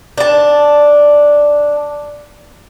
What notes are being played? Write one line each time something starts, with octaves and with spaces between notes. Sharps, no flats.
D4 A5